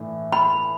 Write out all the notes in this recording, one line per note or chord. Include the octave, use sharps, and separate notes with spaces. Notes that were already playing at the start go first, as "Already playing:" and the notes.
Already playing: A2 E3 A3 D4
B5